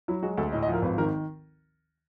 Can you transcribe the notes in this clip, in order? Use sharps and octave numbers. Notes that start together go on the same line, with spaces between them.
F#3 E4
G#3 F#4
D2 A4
A2 D#5
D#5
F3
A#4
G#1 B4
D#3 A#4